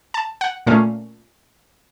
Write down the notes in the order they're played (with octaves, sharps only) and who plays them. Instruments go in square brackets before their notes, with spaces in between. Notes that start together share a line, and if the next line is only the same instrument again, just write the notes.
[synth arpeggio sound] A5
F#5
A#2 A3 C#4 F5